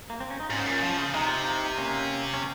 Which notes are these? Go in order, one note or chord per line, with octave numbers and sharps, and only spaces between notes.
A#3
C4
C#4
D#4
G#2 C#4 F4
A#2
F3
C#3
C3 D#4
F4
C4 D#4
A#3 C#4
C#4